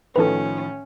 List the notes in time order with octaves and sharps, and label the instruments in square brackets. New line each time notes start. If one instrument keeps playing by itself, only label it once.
[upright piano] A2 D#3 F3 [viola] C#4 [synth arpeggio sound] A4 B4